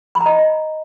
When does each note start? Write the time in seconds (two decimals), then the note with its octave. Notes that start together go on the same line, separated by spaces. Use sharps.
0.15 B5
0.21 A#5
0.26 D#5